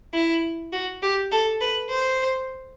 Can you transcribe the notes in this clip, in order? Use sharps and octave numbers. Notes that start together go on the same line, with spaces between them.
E4
F#4
G4
A4
B4
C5